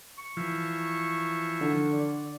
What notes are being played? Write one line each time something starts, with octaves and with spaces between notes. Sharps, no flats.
C#6
E3 F3
D3
D5